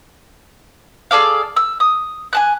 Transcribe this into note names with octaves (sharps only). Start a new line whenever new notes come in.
G#4 A4 D5 F5
E6
D#6
G#5 A5 F#6